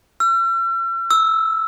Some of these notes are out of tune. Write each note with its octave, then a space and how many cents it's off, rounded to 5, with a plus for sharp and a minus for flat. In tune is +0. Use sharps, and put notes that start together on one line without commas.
E6 +45
E6 -10